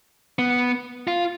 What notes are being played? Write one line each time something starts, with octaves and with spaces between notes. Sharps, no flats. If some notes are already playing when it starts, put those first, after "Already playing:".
B3
F4